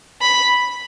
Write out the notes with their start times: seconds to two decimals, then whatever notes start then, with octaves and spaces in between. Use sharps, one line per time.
0.22 B5